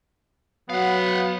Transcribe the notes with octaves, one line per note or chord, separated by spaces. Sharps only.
F#3 B3 F5 F#5